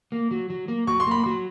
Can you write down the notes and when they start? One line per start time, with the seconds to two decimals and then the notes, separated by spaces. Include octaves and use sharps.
0.12 A#3
0.31 F#3
0.50 F#3
0.68 A#3
0.87 F#3 C#6
1.00 C6
1.07 A#3 B5
1.24 F#3 C6